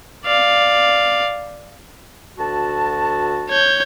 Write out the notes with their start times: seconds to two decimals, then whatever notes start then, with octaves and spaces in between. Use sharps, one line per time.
0.25 D5 F5
2.38 D2 F#4 A5
3.49 C#5 G6